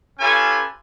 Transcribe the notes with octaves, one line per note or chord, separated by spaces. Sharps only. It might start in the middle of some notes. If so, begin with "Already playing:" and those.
C#4 F4 G4 A4 B4 G#5